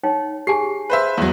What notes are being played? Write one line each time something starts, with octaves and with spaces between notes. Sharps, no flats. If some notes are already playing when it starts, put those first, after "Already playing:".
D#4 C#5 G5
G4 G#4 G#5 C7
B4 C5 E5
E2 F#3